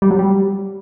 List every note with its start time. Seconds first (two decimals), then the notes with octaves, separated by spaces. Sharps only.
0.02 G3
0.10 F#3
0.19 G3